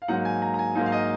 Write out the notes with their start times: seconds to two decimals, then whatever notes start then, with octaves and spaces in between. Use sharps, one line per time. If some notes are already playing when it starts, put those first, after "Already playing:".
0.02 F5
0.08 G#2 F#3 A#3 D#4 F#5
0.25 G#5
0.42 A#5
0.54 A#5
0.59 G#5
0.75 G#2 F#3 A#3 D#4
0.86 F5
0.92 D#5